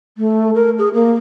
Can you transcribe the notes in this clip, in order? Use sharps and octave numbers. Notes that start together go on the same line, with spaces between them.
A3
A#4
G#4
A#3